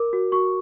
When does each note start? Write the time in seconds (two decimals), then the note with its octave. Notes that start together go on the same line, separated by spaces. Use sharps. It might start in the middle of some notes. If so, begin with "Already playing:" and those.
Already playing: A#4 D6
0.13 F#4
0.32 F#4 C#6